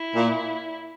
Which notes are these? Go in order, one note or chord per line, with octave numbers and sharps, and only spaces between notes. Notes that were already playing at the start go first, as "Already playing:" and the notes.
Already playing: E4
A#2